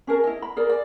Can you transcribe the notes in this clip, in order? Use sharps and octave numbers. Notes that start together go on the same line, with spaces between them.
C#4 G#4 A#4 A5
E4 D#5
B5
G#4 A#4 D5
D5